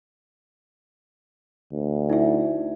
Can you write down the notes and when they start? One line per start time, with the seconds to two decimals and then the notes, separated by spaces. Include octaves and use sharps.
1.73 D2
2.10 D#4 E4 E5